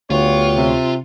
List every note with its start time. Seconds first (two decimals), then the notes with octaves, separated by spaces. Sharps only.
0.10 D2 B3 F4 G4 C#5
0.57 C3